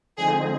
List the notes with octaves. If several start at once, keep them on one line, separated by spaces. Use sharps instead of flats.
D3 F3 G#3 C4 D#4 G#4